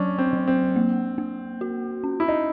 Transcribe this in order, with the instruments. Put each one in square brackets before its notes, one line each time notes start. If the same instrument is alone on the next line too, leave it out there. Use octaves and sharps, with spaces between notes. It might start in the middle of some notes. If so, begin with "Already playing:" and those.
Already playing: [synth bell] F#3 [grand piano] C#4 D4
[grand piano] C4
[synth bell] F#3
[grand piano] C4
[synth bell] A#3
A#3
F#4
C#4
[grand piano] E4
D#4